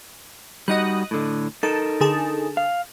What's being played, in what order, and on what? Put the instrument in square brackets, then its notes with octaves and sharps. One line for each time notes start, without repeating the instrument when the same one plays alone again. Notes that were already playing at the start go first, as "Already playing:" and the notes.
[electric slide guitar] G3 D#4 F#4 [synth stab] D#5 D#6 F#6
[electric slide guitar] A2 D3
[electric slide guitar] D#4 A4 A#4 [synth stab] A5
[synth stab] D3 G#4 A5
[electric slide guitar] F5